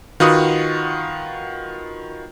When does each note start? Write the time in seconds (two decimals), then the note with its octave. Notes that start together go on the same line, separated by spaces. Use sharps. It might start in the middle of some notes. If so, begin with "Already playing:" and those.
0.20 D#3 F4 F#4 B4 F#5 D#6